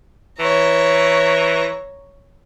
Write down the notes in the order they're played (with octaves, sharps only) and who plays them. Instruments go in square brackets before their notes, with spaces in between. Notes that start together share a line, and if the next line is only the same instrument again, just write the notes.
[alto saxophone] E3 [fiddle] C#5 A#5